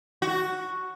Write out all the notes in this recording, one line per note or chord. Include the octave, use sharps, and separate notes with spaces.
F#4